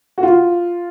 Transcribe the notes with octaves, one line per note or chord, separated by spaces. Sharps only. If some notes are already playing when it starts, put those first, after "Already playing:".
F#4
F4